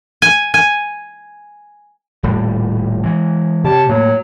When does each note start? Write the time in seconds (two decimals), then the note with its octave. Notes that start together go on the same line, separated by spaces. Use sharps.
0.22 G#5
0.54 G#5
2.23 D#1 A2 G3
3.03 E3 G#3
3.64 C3 G4 C#5 A5
3.89 A2 F#3 A#3